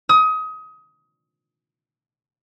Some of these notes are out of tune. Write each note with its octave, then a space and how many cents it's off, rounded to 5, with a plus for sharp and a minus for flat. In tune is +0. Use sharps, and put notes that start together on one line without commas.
D#6 +25